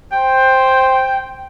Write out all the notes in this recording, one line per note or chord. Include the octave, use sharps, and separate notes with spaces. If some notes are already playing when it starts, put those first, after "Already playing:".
C5 G5